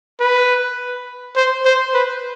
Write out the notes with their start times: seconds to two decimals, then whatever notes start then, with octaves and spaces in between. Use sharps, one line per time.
0.20 B4
1.36 C5
1.65 C5
1.94 B4